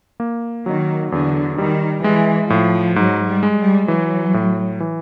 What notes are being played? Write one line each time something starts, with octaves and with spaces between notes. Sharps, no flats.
A#3
D#3 F#3
E2 D3
D#3 G3
E3 G#3
A2 F3
G#2 F#3
G3
G#3
G3
E3 F#3
A2
E3